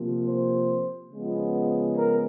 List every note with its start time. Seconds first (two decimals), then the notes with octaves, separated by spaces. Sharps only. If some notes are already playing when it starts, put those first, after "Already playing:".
Already playing: C3 F3 A#3
0.27 C5
1.11 C#3 F3 G#3 B3
1.96 A#4